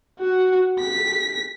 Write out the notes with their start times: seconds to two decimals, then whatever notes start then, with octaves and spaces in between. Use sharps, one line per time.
0.20 F#4
0.80 B6